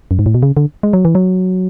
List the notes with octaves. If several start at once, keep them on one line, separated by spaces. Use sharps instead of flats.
F#2
G#2
A2
B2
C#3
D3
G#3
F#3
E3
F#3